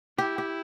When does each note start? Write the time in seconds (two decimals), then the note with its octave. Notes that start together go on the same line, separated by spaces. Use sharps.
0.18 E4 G4
0.38 G4